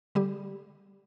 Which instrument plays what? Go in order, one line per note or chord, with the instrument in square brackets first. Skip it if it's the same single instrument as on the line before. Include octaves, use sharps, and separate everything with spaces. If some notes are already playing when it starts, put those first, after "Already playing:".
[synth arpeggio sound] D3 G3 G4